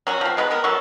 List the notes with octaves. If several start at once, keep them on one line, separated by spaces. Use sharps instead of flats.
F#3 C#4 F#4
F3 C4
D#3 G#3 B3 B4
B3 A#4
F#3 C#4 A4 C#6